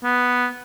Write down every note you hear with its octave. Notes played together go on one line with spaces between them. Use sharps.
B3